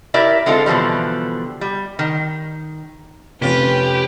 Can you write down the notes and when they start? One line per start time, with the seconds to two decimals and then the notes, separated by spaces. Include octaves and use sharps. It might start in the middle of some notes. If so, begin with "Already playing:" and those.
0.14 E4 G4 A#4 D5 E5
0.46 D3 G#3 C4 F4 A4
0.66 B2 D3 E3 F3 G3
1.61 G3
1.99 D#3
3.42 F1 C#4 F4 G4 B4